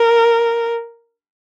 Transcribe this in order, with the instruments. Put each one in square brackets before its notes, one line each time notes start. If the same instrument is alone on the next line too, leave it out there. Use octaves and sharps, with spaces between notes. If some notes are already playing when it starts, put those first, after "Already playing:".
Already playing: [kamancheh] A#4